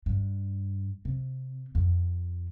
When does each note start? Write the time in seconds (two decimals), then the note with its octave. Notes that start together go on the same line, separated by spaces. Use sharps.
0.06 G2
1.05 C3
1.75 F2